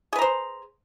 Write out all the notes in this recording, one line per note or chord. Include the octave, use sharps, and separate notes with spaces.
G#4 B4 C5 A#5